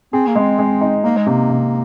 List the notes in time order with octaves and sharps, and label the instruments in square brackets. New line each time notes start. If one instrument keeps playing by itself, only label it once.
[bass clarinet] C4 [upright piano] G#4
[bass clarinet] A#3
[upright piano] G#3 [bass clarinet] C4
[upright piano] G#3
D#4
[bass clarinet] A#3 [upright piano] D#4
[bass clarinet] G#3
[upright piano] C3 [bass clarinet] A#3
[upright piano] C3